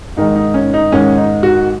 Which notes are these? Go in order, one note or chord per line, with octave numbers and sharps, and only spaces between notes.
G#2 D#3 G#3 D#4
D#4
C#4
D#4
G#2 D#3 G#3 C#4
D#4
F#4